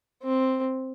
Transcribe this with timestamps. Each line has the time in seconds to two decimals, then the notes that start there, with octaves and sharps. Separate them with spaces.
0.23 C4